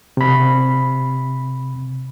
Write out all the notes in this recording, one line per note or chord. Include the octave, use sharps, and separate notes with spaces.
C3 B5